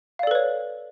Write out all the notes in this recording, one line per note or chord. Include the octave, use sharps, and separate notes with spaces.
A4 B4 C#5 D5 F5